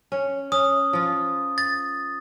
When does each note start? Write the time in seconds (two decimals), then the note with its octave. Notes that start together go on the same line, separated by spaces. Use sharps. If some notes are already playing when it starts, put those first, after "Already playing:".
0.12 C#4
0.52 C#4 D#6
0.93 F3 F4
1.58 A6